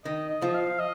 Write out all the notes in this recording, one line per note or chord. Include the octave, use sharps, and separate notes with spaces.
D#3 D#5
D#5
F3
F5
D#5